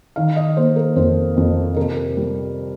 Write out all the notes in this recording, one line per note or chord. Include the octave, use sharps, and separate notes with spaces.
D#3 F5
D#5
A#3 C5
A#4
F2 C5
F2
C3 A#4
G3